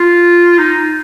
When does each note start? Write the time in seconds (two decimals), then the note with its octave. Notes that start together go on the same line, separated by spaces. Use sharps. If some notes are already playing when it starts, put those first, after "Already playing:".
Already playing: F4
0.59 D#4